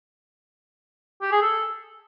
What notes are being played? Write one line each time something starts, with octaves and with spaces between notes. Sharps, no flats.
G4
G#4
A4